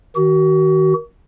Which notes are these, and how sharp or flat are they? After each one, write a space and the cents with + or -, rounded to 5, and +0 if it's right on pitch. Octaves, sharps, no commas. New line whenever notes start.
D#3 +15 F#4 +35